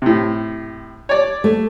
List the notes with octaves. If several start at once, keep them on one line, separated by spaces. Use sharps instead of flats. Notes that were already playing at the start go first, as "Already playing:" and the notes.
A2 C3
C#5 D5
A3